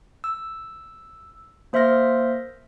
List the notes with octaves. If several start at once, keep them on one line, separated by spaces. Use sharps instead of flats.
E6
A#3 C5 E5 C6 F6 A#6